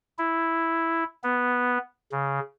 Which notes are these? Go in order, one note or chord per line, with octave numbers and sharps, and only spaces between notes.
E4
B3
C#3